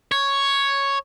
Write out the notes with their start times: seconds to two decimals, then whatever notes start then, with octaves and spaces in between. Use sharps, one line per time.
0.12 C#5